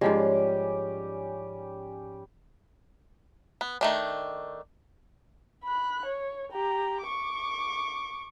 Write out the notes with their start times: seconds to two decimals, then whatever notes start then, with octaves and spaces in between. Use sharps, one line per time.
0.01 G#2 F3 G3 G#3 C#4 G4
3.61 B3
3.81 D#3 A3 D4
5.64 B5 F#6
6.05 C#5
6.52 G4 A#5
7.03 C#6 D6